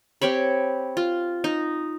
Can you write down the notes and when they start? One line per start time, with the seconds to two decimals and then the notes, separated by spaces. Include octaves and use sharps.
0.21 C4 G4 C#5 B5
0.97 F4
1.44 D#4